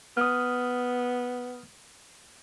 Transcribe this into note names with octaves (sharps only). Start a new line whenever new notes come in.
B3 D#6 F6